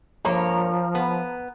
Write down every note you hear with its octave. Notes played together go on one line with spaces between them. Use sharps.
G2 F3 A#3 C#5 A#5
B3